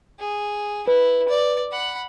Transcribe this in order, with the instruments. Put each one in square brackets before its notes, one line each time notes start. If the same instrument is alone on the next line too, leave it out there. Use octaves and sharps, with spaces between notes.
[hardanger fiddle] G#4
[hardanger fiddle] E4 [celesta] B4
[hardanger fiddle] D5
F#5 B5